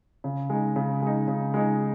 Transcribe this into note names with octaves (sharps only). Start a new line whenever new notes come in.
C#3
G#3 D#4
C#3
G#3 D#4
C#3
G#3 D#4